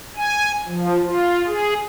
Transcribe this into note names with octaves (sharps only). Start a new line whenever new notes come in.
G#5
F3
F4
G#4